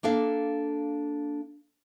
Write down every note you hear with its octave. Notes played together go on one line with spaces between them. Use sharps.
A#3 D4 A4 F5